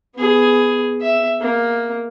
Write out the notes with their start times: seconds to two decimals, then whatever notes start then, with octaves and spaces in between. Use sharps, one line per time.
0.15 B3 G#4
1.01 E5
1.40 A#3